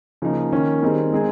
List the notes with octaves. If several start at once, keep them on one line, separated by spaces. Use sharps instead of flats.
C#3 F3 A#3 D#4
D#3 A#3 C#4
D#3 G3 C4 D#4 G#4
G#3 C4 D#4 G#4